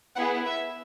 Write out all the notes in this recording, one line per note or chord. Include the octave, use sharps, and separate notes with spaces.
B3 E4 G#4 F#5
E5